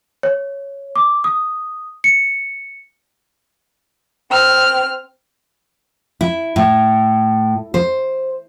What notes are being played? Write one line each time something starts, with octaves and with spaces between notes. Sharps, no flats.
C#5
D6
D#6
C#7
C4 F6
E4
A2
C5